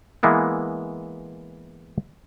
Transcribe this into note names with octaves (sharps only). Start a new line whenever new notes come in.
E3 G#3 A#3 B3 E4